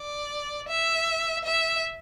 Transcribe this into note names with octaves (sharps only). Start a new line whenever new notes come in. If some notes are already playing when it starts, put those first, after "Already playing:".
Already playing: D5
E5
E5